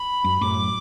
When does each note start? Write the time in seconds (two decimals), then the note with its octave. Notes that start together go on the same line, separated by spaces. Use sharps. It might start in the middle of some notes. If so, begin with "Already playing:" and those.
Already playing: B5
0.24 F#2
0.41 F#2 A2 D6